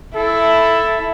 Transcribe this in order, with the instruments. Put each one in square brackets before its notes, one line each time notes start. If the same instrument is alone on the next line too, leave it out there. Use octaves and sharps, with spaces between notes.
[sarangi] E4 [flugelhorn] A4